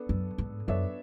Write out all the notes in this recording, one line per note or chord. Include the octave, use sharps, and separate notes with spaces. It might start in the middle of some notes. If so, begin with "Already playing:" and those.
Already playing: B3 D4 A4
F#2
G#2
F#2 B3 D4 A4 C#5 E5